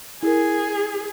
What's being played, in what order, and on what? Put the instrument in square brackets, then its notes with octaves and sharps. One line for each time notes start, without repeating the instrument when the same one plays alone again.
[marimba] E4 A#4 [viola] G#4